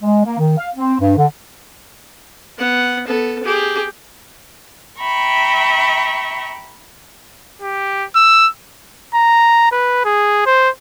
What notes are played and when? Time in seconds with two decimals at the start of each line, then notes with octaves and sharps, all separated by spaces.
0.02 G#3
0.25 A#3
0.39 D#3
0.58 F5
0.76 C4
1.00 G2
1.18 D3
2.58 B3 F#5
3.07 B3 A4
3.44 G4 G#4
5.00 E5 G5 A#5 B5 C#6
7.62 G4
8.15 E6
9.14 A#5
9.72 B4
10.05 G#4
10.46 C5